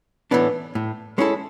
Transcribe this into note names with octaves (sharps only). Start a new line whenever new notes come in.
A2 E3 B3 D4
A2
G#3 C#4 E4 A4